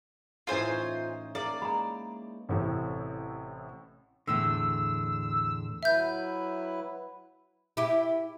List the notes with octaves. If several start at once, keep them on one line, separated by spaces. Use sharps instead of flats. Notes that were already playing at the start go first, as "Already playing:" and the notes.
A2 E3 C#4 D#4 F4 C5 F5 G#5
A#3 D5
G#3 A#5 B5
A1 A2 C3
E2 A2 D3 E6
F#3 E4 B4 E5 G6
E4 G4